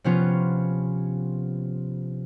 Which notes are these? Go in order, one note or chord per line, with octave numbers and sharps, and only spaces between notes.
C3 F3 B3 C#4 F4